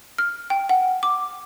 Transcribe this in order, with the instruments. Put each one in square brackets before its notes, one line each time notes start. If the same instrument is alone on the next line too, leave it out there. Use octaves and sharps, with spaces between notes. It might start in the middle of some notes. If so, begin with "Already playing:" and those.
[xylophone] F6
G5
F#5
D6